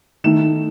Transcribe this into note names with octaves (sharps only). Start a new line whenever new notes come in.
D#3 A3 D#4 E7